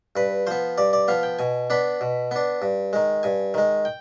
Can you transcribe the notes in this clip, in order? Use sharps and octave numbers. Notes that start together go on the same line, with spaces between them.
G2 B4
F3 B3 C5
G2 D5
D5
F3 B3 F5
G5
B2 G#5
B3 D4 B5
B2
B3 D4
G2
D#3 G#3
G2 G#5
D#3 G#3
G5